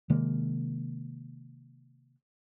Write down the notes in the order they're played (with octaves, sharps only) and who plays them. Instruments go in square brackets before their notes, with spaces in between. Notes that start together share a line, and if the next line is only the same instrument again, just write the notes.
[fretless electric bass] C3 D#3 G#3 A#3